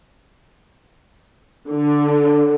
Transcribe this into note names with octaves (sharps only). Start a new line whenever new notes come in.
D3